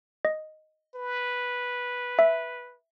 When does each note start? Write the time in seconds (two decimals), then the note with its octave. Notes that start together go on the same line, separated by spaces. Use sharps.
0.25 D#5
0.95 B4
2.19 E5